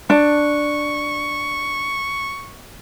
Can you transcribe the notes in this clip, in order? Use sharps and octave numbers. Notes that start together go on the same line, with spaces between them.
D4 C#6